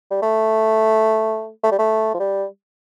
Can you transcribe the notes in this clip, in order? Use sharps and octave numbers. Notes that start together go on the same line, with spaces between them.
G3
A3
A3
G3
A3
F3
G3